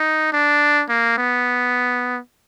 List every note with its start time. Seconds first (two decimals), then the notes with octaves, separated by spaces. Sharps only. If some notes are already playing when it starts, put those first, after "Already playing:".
Already playing: D#4
0.32 D4
0.89 A#3
1.18 B3